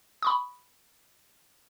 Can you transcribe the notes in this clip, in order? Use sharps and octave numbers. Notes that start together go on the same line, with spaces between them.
B5 C#6 D#6